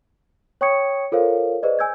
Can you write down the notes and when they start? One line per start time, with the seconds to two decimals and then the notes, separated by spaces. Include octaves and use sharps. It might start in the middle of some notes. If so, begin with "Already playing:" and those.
0.61 C#5 G5 C#6 D#6 G#6 C#7
1.12 F4 A4 A#4 C5 C#5 F5
1.63 G#4 B4 C5 D5 D#5
1.79 G#5 E6 G6 G#6